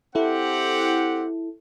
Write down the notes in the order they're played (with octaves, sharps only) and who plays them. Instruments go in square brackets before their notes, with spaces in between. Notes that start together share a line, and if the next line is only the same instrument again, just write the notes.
[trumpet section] C4 G4 F#5 [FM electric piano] E4 A4